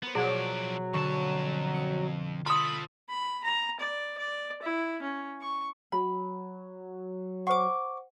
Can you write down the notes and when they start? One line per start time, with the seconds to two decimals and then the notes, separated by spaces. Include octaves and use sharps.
0.03 B3 A#4 C5
0.15 B2 F3 F#3 G#4 D5
0.93 F2 D3 A5 C#6
1.74 C#7
2.46 F4 A4 B5 C6 D#6
3.10 B5
3.44 A#5
3.80 D5
4.18 D5
4.63 E4
5.02 C#4
5.41 C#6
5.92 F#3 B5
7.47 C5 F#5 C#6 D6